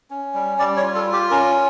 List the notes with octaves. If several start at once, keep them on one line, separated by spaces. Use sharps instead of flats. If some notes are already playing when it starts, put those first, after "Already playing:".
C#4
G3
G3 D5
C#5
F4
A4
F4
G4
C#4 A#4